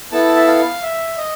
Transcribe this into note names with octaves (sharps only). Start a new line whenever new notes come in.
B3 E4 A4 A5
E5
F5
E5
D#5